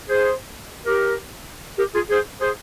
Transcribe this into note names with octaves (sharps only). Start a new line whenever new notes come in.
G#4 C5
G4 A#4
G4 A#4
F4 G#4
G#4 C5
G#4 C5